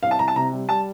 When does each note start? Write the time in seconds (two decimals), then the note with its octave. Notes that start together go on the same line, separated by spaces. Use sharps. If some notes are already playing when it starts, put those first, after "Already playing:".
0.03 C2 F5
0.11 A5
0.19 C2 A#5
0.28 A5
0.36 C3 A#5
0.53 G3
0.69 G3 A5